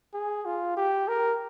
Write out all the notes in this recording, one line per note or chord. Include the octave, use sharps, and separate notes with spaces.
G#4
F4
G4
A#4